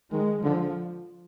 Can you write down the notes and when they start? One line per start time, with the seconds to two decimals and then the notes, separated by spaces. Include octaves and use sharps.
0.12 D#3 G#3
0.43 D3 F3